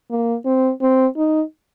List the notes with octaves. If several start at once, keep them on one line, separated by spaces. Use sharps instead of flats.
A#3
C4
C4
D#4